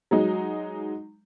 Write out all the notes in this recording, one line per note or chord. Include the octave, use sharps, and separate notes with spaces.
F#3 G#3 D#4